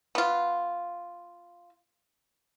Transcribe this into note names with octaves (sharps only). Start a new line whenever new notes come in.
B3 F4